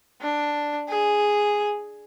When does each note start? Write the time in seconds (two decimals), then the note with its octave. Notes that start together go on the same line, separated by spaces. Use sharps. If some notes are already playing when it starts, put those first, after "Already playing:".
0.22 D4
0.89 G#4